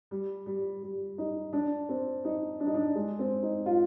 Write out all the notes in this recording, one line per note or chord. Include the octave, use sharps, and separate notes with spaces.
G3
G3
G3
D#4
D4
C4
D#4
D4
D#4
D4
G#3
C4
D#4
F4